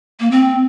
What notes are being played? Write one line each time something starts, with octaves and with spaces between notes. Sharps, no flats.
A#3
C4